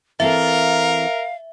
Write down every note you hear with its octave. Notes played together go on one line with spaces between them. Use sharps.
E3 C4 A4 A#4 E5 F5